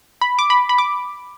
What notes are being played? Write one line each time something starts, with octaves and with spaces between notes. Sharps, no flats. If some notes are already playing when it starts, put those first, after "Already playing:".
B5
D6
B5
B5
D6